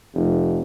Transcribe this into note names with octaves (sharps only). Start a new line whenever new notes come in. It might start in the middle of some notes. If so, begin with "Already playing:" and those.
F1